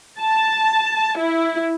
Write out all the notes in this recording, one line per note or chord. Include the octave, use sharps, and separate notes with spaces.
A5
E4